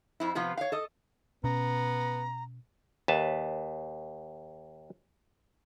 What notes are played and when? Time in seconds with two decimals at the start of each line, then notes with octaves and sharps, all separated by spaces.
0.20 F2 C4 E4
0.35 C3 F3 B3 F4
0.57 C#5 F5
0.72 A4 D#5
1.44 B2 B3 C#4 A#5
3.08 D#2 B4 E5 A5